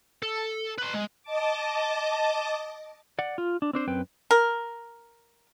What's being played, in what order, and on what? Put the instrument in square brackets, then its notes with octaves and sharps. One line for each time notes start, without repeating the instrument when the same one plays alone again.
[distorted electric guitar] A4
B4 C6
G#3
[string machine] D#5 A5 D6
[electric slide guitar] D5 F#5
F4
D4
C4 D4 C5
F#2 C4 B4 G5
[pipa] A#4